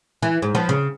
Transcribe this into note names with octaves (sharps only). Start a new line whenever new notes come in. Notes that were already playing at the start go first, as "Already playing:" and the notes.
E3
G#2
F3 B3
C#3